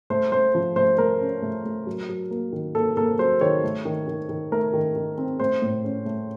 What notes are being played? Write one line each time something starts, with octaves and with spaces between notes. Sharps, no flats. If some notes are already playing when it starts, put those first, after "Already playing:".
A3 C5
A3 C5
F3
A3 C5
A3 A#4
C#4
A3
A3
F#3
F#3
A#3
D#3
A#3 A4
A#3 A4
F#3 C5
D#3 C#5
A3
D#3
D#3
D#3
A3 A#4
D#3
D#3
C4
A3 C5
A2
C#4
A3